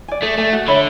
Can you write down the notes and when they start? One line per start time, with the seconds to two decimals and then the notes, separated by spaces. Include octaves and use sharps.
0.08 D5 G#5
0.22 A3 G#4
0.38 A3 D5 G#5
0.52 F#4
0.68 D3 C#5 E5 B5